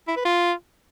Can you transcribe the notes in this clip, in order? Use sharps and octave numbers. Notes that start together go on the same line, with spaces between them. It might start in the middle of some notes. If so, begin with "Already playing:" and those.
E4
B4
F4